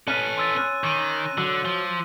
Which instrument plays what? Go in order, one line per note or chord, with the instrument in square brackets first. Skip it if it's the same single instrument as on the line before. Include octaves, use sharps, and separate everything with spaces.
[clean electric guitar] C#4 [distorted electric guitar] A4 B4 [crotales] F#6 D#7
[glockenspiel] C6 E6 A6
[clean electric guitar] C#4 [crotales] F#6
[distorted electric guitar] D#3 [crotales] D6 D#7
[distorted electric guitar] D3 [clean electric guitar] F#3 [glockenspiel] E6
[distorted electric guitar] F3